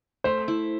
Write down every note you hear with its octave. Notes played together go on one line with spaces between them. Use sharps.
A3 C5
E4